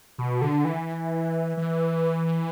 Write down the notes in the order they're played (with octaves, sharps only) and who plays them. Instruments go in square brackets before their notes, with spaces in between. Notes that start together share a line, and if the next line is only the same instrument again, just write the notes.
[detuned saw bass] B2
D3
E3
E3